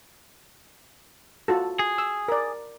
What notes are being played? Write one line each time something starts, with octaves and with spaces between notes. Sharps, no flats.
F4 F#4 A4
G#4
E6
A#4 D5